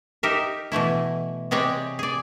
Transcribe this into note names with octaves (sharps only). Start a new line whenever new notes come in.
D#4 G4 A#4 E5
B2 E3 A3 E4
C3 G#3 C4 G4 C#5 D5
G#4 D5